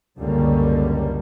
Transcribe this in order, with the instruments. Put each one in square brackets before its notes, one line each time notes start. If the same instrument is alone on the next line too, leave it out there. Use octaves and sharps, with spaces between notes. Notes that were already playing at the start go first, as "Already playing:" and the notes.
[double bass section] C#2 F#2 D3 G3 A#3 C#4